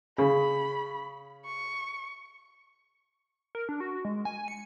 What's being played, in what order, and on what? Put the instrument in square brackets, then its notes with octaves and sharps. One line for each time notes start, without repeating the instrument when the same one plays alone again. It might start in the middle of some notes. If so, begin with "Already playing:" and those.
[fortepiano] C#3 [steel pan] G#4 [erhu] B5
[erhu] C#6
[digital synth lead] A#4
D4
F#4
G#3
G#5
C#7